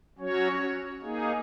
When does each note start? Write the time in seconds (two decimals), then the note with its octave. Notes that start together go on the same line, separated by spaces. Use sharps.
0.18 F#3 C#4 F#4 C#5
1.03 A#3 D#4 G#4